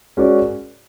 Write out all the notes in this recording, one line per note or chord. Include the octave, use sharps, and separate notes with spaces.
G#3 C#4 F#4 A#4 D5